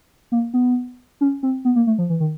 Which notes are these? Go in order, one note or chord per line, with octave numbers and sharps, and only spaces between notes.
A#3
B3
C#4
C4
B3
A#3
A3
F3
E3
D#3